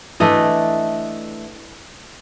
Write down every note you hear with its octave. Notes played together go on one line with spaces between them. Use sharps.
E3 A3 D4 D#5